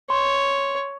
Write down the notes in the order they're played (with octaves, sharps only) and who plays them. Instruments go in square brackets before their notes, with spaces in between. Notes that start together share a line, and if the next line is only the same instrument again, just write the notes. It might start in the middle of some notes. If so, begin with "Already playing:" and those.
[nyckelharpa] C#5 [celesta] C6